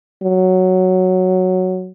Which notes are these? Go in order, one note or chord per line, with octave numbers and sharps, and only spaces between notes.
F#3